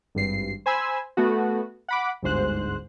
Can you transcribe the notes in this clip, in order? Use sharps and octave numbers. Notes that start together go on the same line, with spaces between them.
G#1 G2 C7
C5 G#5 B5 E6
A3 B3 F#4
F#5 B5 D6
G1 D2 G#2 C5 F#6